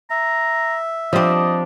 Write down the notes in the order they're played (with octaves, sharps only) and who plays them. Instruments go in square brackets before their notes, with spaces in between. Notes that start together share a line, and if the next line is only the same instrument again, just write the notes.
[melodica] E5 [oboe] A#5
[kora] F3 C4 [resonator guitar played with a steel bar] G3 D4 [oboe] D#5